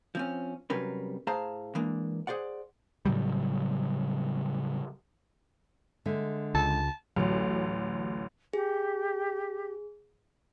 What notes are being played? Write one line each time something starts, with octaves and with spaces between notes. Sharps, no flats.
F3 C4 C#4
C3 F#3 G3 C#4 A#4 B4
A2 G#4 C5 F5 A5 A#5
E3 G#3 A#3 D4
G#4 C5 D5 F#5
A2 C#3 F#3 G3
D3 G#3 E5
C#2 A5
A1 D2 F#3 A3
G4 G#4